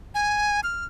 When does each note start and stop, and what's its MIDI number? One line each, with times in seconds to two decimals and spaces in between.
0.15 0.60 80
0.64 0.85 89